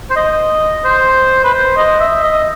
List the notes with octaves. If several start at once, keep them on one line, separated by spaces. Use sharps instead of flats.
C5
D#5
C5
B4
C5
D#5
E5
D#5